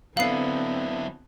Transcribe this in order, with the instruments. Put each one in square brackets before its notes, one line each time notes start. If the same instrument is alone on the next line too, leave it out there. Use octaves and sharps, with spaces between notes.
[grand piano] D3 B3 F#7 [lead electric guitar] F#3 E4 [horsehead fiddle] C4 [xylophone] F5 C7